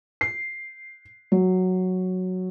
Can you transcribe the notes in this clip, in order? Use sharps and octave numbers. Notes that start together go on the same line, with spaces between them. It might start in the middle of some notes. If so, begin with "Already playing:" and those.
C7
F#3